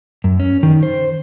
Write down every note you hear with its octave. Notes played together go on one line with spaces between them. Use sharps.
F#2
C#4
D#3
C5